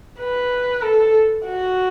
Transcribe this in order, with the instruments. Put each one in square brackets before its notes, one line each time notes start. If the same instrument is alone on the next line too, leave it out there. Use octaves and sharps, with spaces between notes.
[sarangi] B4
A4
F#4